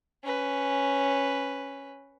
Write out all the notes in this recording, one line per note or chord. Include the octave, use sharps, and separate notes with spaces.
C#4 B4